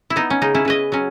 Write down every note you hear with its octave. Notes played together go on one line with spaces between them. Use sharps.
E4
B3 D#4
C#4
C#3 D#4
C#4 E4
C#3 B4 D#5
F#3 C#4